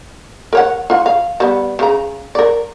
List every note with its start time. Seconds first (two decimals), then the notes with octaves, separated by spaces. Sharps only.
0.53 A#4 C#5 F#5
0.90 F4 F#5
1.06 F5
1.40 G3 B3
1.79 C#3 A#5
2.35 A#4 D5